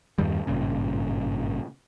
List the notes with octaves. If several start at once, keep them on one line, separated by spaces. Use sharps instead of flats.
E2 G2 D#3 G3
G#1 G2 A#2 C#3